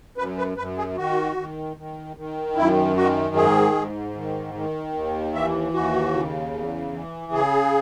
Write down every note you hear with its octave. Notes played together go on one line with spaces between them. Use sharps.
F#2 B4
B4
F#2 B4
G#4
D#3 F#4
D#3
D#3
D#3
F#2 E4
D#3 F#4
G#2 G#4
G#2
D#3
D#3
D#2
E3 E5
D#2 F#4
C#3
E2
E3
C#3 G#4